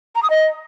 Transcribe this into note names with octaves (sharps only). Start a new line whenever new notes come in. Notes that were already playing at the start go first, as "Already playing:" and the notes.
A#5
D#6
D#5